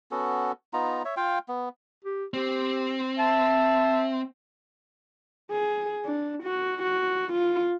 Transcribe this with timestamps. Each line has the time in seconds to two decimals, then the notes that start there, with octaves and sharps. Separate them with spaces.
0.11 B3 C#4 F#4 A4
0.73 B3 D#4 F4 A#5
1.05 C#5 E5
1.17 F4 F5 G5
1.48 B3
2.04 G4
2.34 C4 G4
3.19 E5 A5
5.52 G#4
6.05 D4
6.43 F#4
6.83 F#4
7.33 F4